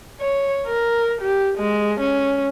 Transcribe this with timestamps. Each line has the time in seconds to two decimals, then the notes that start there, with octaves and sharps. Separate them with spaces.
0.21 C#5
0.67 A#4
1.21 G4
1.58 G#3
2.00 C#4